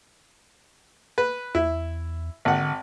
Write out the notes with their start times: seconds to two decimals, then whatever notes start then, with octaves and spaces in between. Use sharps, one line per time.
1.18 B4
1.55 E2 E4
2.45 G#1 D3 F#5